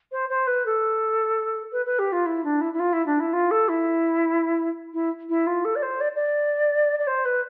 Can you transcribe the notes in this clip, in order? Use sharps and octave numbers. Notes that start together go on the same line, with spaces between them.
C5
C5
B4
A4
B4
B4
G4
F4
E4
D4
E4
E4
F4
E4
D4
E4
F4
A4
E4
E4
E4
F4
A4
D5
C5
D5
D5
D5
C5
B4